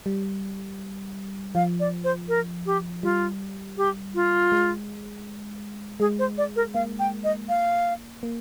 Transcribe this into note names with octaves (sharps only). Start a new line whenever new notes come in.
G3
F3 F5
D5
C5
A#4
G4
G3 F4
G4
F4
G#3
G#3 G#4
C5
D5
A#4
A#3 F5
G5
D#5
F5
A#3